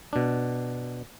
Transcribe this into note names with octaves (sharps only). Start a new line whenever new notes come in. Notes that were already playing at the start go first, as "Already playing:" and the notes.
B2 D4